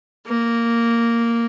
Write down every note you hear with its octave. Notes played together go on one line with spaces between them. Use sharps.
A#3